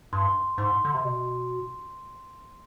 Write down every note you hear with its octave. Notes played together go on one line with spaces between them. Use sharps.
G2 C6
G#2 C6
D3
C3
B2